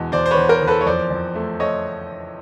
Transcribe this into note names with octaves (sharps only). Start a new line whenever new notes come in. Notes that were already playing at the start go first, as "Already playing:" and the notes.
Already playing: E2 B2 G#3
E2 C5 D5
C5
B4 C#5
E2
A#4 C5
E2
A4 B4
C#5
F2 C5 D5
F2
A3
A3 C#5 D#5